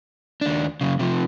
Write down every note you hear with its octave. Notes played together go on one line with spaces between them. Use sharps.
D#2 D4
F#2 C#3
C3 F3